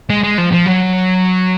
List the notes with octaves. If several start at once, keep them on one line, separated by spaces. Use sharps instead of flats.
G#3
G#3
F3
F3
F#3